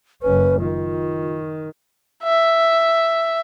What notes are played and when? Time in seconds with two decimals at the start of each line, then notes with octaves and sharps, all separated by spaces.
0.23 F#1 C#4 B4
0.60 D#3 F4
2.23 E5